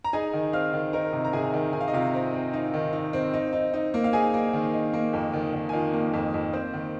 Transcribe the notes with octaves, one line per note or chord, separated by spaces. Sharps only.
A#5
D#4 G#4 G#5
D#3
C4 F5 F6
D#3
D#4 A#4 A#5
C3
A#5
C3 G#4 G#5
D#3
D#3 G#5
F5
D#5
C3 F4 F5
C4
C4
D#4
D#3
D#4
C4
D#4
D#4
D#4
A#3
F5
D#4 G#4 G#5
A#3
D#3
D#4
A#3
F2
D#3
D#3
G#5
D#3 F4 F5
A#3
F2
F2
A#3 C4 C5
D#3